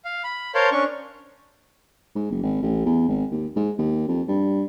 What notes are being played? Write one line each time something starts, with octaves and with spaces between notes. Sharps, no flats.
F5
B5
A#4 C5 C#5 F5 A5 C6
C#4 D4 C#6
G#2
F#1
G#1
A1
E2
G#1
D#2
G#2
D#2
F2
G2